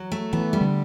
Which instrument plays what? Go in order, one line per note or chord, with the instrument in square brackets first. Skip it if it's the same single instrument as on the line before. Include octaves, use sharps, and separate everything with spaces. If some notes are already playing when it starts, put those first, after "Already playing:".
Already playing: [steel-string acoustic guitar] F#3
A3
[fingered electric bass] E3 [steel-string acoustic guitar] B3
[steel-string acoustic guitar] G3
[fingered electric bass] D3